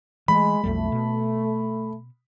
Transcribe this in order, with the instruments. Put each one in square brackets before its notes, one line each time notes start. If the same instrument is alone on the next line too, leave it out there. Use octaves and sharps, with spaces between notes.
[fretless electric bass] E3 A3 [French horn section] G#3 [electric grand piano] B5
[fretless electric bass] B1 F2 G3 [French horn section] A3
[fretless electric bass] B2